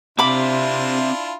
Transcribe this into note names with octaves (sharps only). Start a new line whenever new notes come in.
C3 C4 D4 E4 F4 E5 B5 D6